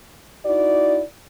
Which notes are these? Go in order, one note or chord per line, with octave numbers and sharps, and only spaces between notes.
D#4 E4 F#4 D5